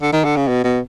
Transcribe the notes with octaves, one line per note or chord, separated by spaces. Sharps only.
D3
D#3
D3
C#3
B2
B2